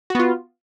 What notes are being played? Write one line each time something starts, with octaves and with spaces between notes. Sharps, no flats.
B3 F4 F#4